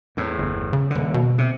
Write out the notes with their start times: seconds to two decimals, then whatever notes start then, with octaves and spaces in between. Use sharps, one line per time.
0.17 E2 A2
0.38 G1
0.73 C#3
0.90 D#1 D3
1.14 B2
1.38 C3